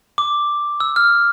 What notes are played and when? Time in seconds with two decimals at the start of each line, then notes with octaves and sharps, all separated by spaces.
0.18 D6
0.80 E6
0.96 F6